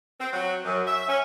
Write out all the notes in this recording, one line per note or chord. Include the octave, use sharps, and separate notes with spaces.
C4
F#3
F#2
E5
C#4